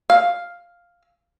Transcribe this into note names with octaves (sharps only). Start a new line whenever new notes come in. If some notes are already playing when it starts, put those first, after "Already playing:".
F5